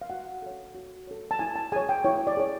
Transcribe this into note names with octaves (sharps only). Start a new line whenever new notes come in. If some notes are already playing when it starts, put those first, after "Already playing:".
F5
F#4 F#5
A4 C#5
F#4
A4 C#5
A5
E4 G#5
A5
G#4 C#5 G#5
G5
E4 C#5
D5
G#4 C#5